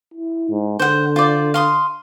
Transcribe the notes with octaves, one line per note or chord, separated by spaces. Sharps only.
E4
G#2
D3 C5 F#5
F4 C5 D5
F5 C6 D#6